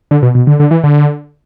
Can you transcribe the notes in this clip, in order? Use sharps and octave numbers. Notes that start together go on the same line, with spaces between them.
D3
B2
B2
D3
D3
E3
D3